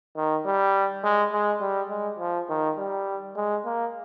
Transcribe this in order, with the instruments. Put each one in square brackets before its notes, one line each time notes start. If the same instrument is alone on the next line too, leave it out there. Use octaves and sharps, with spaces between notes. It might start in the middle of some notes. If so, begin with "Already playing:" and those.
[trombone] D#3
G3
G#3
G#3
G3
G#3
F3
D#3
G3
G#3
A#3